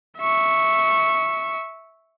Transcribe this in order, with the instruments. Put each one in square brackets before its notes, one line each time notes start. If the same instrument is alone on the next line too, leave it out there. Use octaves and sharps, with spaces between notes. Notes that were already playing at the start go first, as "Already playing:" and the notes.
[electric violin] E5 C#6